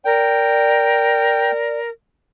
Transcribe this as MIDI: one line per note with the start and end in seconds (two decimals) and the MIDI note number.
0.05 1.89 70
0.05 1.80 74
0.05 1.51 79